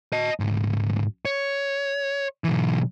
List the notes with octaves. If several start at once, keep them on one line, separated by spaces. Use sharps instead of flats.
D#5 A5
D2 G#2
C#5
B1 E3